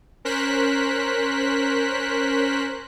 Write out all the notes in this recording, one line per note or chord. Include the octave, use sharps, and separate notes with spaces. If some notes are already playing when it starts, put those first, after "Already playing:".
C#4 A#4 C5 F#6 B6